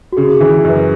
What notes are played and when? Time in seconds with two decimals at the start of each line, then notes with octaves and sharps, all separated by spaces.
0.12 F#4
0.17 C#3 G#4
0.35 G#4
0.40 E3
0.53 G#4
0.64 F#2
0.70 B4